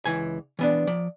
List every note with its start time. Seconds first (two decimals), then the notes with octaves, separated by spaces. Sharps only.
0.05 C#2 E3 G#5
0.59 E3 B3 D4
0.87 F3 D5